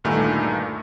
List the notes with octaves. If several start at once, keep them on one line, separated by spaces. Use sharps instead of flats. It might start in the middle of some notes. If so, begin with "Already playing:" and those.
D2 G2 A#2 D#3 A3